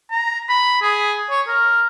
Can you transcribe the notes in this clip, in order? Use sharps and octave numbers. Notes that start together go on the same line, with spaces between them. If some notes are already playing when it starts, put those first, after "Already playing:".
A#5
B5
G#4
C#5
A#4